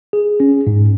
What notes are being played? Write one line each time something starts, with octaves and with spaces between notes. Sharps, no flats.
G#4
C#4
G#2